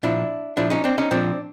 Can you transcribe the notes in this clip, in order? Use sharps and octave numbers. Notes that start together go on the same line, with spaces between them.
A#2 F3 D4 E4
A#2 F3 D4 E4
C#4 D#4
C4 D4
C#4 D#4
A#2 F3 C4 D4